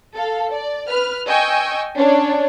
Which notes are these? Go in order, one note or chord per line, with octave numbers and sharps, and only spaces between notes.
A4 F5
D5
B4 F6
D#5 G5 G#5 C#6 E6
C#4 D4 C#5 D5